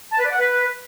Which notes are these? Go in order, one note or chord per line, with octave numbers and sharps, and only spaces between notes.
A5
B4
D5
F#5
B4